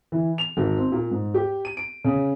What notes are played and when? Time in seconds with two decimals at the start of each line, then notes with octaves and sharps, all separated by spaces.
0.12 E3
0.38 F7
0.57 G#1
0.77 C4
0.92 A#2
1.11 G#2
1.34 G4
1.65 D#7
1.77 D7
2.05 C#3